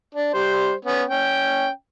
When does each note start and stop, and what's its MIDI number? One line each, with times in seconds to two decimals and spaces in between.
0.15 0.33 62
0.34 0.73 55
0.34 0.73 72
0.85 1.03 59
0.85 1.03 61
1.10 1.69 61
1.10 1.69 79